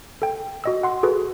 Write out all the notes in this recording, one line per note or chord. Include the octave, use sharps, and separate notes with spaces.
A4 G5
F#4 D#5 E6
F#5 C6
F#4 G#4 A4 B4